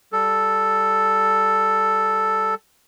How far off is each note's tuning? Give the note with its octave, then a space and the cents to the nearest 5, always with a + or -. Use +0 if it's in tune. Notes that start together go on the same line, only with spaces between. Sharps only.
G3 +0 A4 +0